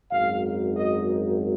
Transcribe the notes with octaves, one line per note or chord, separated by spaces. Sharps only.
G#1 F#2 D#3 F5
D#5